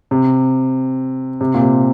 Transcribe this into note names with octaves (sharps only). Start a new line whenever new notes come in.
C3
C3
A#2
C3